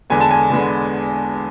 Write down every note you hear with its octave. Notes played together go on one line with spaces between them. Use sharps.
E2 D3 G#3 B3 G#5
A5
G#5
E2 D3 G#3 B3